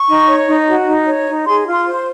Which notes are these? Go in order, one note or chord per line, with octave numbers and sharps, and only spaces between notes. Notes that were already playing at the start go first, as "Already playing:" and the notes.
Already playing: C#6
D#4
C#5
D#4
F#4
D#4
C#5
D#4
G#4 C6
F4
C6
C5